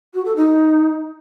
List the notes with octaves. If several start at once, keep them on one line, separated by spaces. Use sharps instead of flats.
F#4
A4
D#4